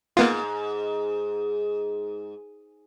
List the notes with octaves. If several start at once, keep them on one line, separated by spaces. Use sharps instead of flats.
G#2 A#3 B3 F4